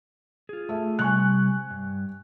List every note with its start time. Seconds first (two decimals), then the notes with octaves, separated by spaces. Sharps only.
0.49 F4 G#4
0.69 A3 E5
0.99 C3 G3 G#5 C#6 F#6
1.71 G2